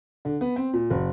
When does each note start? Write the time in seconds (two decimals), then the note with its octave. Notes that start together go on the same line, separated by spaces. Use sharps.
0.25 D3
0.41 B3
0.56 C4
0.73 A#2
0.90 F#1